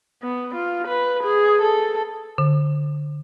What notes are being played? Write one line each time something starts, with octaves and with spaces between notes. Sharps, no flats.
B3
F4
B4
G#4
A4
D3